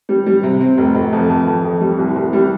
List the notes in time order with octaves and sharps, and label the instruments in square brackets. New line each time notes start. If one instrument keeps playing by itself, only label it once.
[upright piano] G3
G3
C3
C4
F1
F1
F2
F2
F2
F2
G3
C2
C2
G3